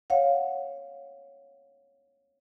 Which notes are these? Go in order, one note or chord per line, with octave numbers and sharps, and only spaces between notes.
C#5 F5 F#5